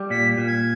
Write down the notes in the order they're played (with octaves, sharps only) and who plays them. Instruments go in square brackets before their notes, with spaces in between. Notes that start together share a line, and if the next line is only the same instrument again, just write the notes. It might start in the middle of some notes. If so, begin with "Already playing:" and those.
Already playing: [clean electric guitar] G3
[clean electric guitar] A#2 [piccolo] B6
[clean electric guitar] A#2
[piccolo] G#6